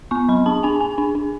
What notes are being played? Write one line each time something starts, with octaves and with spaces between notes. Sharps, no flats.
B3 C#6
F#3 B5
D4 A5
D4 G#5
D4 G#5
D4
D4